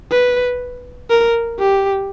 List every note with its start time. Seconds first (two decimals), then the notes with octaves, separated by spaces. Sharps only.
0.11 B4
1.10 A#4
1.59 G4